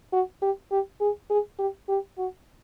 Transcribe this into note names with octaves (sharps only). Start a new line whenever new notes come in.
F#4
G4
G4
G#4
G#4
G4
G4
F#4